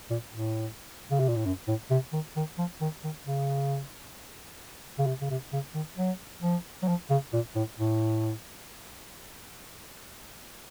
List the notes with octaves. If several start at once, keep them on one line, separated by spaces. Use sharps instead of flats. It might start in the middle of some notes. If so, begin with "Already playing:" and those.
A#2
A2
C#3
C3
A#2
A2
F#2
A2
C3
D#3
D#3
F3
D#3
D#3
C#3
C#3
C3
C#3
C3
C#3
D#3
F#3
F3
F#3
F3
C#3
A#2
A2
A2